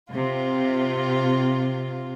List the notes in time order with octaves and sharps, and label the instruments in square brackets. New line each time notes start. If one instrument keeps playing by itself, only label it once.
[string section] C3 F4